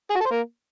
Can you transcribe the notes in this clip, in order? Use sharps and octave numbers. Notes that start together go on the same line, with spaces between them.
G#4
F#4
A4
C5
A#3